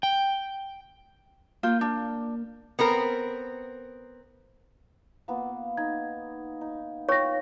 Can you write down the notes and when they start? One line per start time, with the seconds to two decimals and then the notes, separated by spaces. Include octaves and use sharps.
0.03 G5
1.63 A#3 F4 G6
1.81 D4
2.79 B3 C4 A#4
5.28 A#3 B3 F4
5.77 D#4 G#6
6.61 D#4
7.09 F4 C#5 F5 G5 C#6 A#6